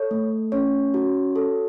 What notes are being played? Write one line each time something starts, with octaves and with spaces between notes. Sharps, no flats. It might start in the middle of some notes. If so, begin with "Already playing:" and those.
Already playing: A4 C#5
A3
C#4 C#5
F#4
A4